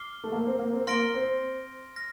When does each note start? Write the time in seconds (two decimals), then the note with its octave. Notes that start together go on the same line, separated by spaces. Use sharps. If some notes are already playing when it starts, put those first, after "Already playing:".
Already playing: D6 F6 C7 G7
0.24 A3
0.32 A#3
0.46 C4
0.59 A#3
0.73 C4
0.87 A#3 C6 F6 A#6 D7 G7
1.14 C4
1.96 F6 A#6